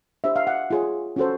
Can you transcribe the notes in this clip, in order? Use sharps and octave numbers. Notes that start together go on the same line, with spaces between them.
D4 G4 C5 E5
F5
F#5
F4 G#4 C#5
C#4 F#4 A4 C5